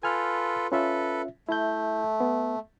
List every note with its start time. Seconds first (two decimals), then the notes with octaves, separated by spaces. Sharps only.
0.03 F4 A4 B4 G#5 F6
0.72 C#4 F4 A4 B4 E5
1.49 A3 E4 G6
2.20 B3